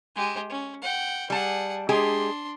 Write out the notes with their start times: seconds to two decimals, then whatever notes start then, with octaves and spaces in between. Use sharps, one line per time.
0.16 G#3 G4
0.50 C#4
0.81 F#5 G5
1.30 G3 G#4 F#5 A5
1.89 G#3 D4 G4 G#4 C6